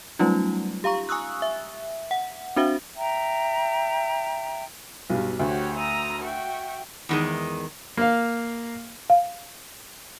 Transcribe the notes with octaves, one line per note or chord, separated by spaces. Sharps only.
F#3 G3 A3 C#4 D#4 F4
G4 F5 A#5 C#6
G#5 C#6 D#6 E6 F#6
E5
F#5
C4 D4 F#4 C5 E5 F5
E5 G5 A#5
B1 G2
D2 F#4 G4 C#5
A#5 D#6 E6
F#4 E5 G5
E2 D#3 G#3
A#3 F5
F5